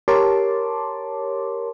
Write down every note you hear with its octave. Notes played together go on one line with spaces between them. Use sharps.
G4 A#4 C#5 A5 C6 D6